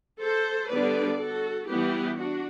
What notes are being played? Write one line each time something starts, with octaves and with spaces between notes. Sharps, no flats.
A4 C5
D3 G3 B3 D4 B4 D5
F#4 A4
E3 G3 B3 E4 G4
D4 F#4